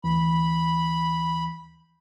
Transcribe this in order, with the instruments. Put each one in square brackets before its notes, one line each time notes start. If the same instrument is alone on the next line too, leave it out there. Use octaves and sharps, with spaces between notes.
[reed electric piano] D2 E3 [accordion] B5